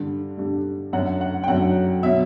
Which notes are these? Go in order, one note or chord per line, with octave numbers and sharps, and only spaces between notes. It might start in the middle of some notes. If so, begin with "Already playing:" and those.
Already playing: G2 D3 G3
G2 D3 G3
F#2 D3 F#3 F#5
F#5
G5
F#2 D3 F#3 F#5
B2 F#3 E5